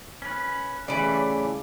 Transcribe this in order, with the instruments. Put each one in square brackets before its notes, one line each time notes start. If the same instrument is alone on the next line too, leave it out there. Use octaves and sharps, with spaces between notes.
[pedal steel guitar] C#4 B4
[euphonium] C#3 [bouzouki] E3 D5 [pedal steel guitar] G3 A3 B5